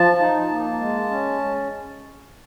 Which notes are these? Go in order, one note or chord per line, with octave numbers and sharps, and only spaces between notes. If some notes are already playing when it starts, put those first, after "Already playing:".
Already playing: F3 A5
D#4
A#3
G#3
C#4